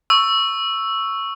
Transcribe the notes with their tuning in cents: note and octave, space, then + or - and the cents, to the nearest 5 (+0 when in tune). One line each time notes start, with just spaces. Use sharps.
C#6 +0 E6 +0